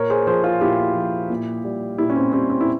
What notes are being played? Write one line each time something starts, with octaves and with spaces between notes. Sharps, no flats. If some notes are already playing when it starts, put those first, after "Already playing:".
Already playing: A#2 A#4 C#5
G#4 C5
F3 G#4 C5
F4 G#4
A#2 E4 G4
F3
A#2
G3
A#2 E4 G4
C#4
C4 E4
G3 C4
C4
E4